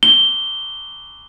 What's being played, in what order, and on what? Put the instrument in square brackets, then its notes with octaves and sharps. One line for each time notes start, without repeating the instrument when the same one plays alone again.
[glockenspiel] G7